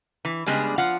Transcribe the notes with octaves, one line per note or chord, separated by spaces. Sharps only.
E3
C#3 G3 G#3 B3 D4 G#4
F3 F4 F5 F#5